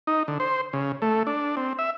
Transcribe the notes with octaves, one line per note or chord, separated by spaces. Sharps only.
D#4
D3
C5
C#3
A3
D4
C4
E5